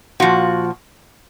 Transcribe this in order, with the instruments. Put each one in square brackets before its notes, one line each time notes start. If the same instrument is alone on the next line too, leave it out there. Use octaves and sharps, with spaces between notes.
[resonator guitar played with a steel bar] A#2 F3 F#4